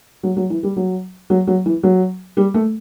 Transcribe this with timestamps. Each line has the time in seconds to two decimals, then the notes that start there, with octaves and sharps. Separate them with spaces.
0.23 F#3
0.37 F#3
0.50 E3
0.63 G3
0.76 F#3
1.30 F#3
1.47 F#3
1.66 E3
1.83 F#3
2.37 G3
2.54 A3